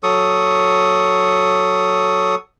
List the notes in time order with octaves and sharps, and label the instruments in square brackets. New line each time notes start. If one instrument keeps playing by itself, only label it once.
[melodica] F#3 A4 C#6 D#6